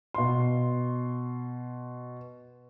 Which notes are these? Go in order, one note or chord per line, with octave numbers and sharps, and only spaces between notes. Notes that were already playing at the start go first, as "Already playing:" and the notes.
B2 C6